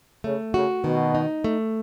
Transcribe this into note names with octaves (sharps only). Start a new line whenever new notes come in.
C#3 A3
C#3 F#4
B2 D#3
D#4
A3